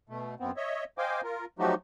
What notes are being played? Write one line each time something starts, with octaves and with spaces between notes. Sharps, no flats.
B2 A3
F#2 B3 C4
C#5 D#5 E5
C5 D#5 F5 G5 G#5 D6
F4 A#4
F3 F#3 A3 D#4 F#4 G4